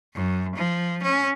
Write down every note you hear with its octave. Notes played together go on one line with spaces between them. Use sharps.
F#2
F3
C#4